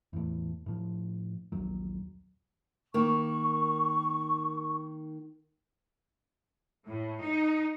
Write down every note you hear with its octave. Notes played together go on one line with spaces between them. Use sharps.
E2 A2
A2 F3
A#1 D#2 F#3
D#3 A#3 C#6
A2
D#4